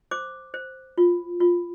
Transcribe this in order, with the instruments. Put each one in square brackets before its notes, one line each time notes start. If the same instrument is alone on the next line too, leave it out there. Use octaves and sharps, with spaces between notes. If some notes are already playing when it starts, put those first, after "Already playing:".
[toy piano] C5 D6
C5
F4
F4